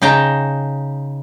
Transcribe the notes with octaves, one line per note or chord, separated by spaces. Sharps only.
C#3 D#4 G5 A5 A#5